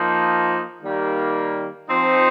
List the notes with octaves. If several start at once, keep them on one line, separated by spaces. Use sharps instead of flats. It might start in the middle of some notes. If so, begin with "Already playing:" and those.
Already playing: F3 A#3 D#4
D#3 G3 A#3
F3 C4 D#4